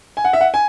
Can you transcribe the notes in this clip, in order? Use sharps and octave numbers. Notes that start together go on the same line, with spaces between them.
G#5
F#5
E5
F#5
G#5